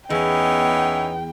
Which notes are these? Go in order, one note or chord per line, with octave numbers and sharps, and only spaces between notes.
E2 B3 C#4 D#4 E4 G5